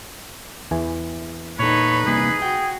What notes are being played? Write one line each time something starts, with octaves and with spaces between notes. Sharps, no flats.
E2 E3 G#5
A#2 D#4 A4 B4 C#5
C2 A#3 G#4
F#4 G5